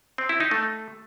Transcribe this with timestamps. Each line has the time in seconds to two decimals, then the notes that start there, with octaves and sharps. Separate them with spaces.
0.18 C4
0.29 E4
0.40 D#4
0.51 A3